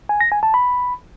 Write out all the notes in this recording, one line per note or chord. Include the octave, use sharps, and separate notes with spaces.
G#5
A#6
G#5
A5
B5